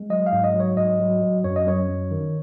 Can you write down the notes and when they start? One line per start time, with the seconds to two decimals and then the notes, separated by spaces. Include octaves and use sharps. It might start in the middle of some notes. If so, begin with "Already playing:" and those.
Already playing: G#3
0.10 F#3 D#5
0.26 F5
0.32 G#2
0.44 D#5
0.54 F#3
0.60 C#5
0.77 G#2 D#5
0.99 F#3
1.22 F#3
1.44 F#2 C#5
1.56 D#5
1.66 F#2 C#5
1.89 F#2
2.11 D#3